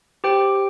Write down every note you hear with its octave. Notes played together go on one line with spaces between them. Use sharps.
G4 C5 G5